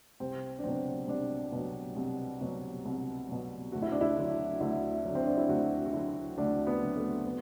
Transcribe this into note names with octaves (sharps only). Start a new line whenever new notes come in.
C2 C4
D4
B2 F#3 C4
C2 D4
B2 F#3
C2
B2 F#3
C2
B2 F#3
D2 F#4
E4
D4
E4
D3 F#3
D2 E4
D3 F#3
C4
D4
E4
D2 F#4
F#4
D3 F#3 E4
D2 D4
B3
D3 F#3
A3
B3